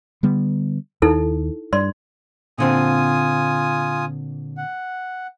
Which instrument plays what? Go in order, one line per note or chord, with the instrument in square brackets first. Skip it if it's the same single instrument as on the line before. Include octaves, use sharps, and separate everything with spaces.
[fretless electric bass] D3 G3 B3
[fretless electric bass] D#2 [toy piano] D#4 E4 A4
[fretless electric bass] G2 [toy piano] D5 C6
[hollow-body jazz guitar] A#2 D3 C4 [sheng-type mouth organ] F4 G#5 D#6
[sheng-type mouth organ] F#5